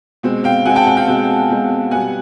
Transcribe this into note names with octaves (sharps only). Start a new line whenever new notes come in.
B2 G#3 C4
F5 G5
B2 G#3 C4 F#5 G#5
G5 A5
F#5 G#5
F5 G5
B2 G#3 C4
B2 G#3 C4
B2 G3 B3 F#5 G#5